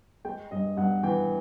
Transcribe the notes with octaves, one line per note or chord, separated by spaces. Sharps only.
G#3 G5
G2 D#5
G2 F#5
E3 G5